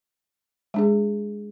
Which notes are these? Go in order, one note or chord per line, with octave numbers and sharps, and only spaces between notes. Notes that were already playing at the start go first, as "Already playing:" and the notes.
G#3 D4 G#4